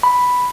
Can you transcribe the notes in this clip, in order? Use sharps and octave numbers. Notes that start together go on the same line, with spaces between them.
B5